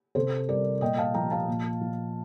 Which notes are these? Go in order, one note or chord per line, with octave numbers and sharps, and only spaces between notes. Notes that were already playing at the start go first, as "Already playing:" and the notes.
C3 A4 C5
G3 A#4 D5
A#2 D#5 G5
F5 A5
F3 G5 A#5
F5 A5
A#2
F3